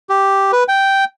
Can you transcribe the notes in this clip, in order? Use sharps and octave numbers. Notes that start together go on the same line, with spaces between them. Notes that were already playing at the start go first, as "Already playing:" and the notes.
G4
B4
G5